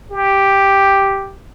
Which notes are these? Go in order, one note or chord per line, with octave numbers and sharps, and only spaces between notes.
G4